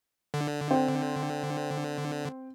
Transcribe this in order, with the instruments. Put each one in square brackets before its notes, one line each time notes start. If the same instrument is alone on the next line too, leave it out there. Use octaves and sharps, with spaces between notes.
[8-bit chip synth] D3
[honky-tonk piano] C4